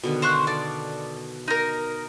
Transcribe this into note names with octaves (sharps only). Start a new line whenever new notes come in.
B2 D3 D#3
C5 F5 C#6 F#6
A4 D5
D#4 A#4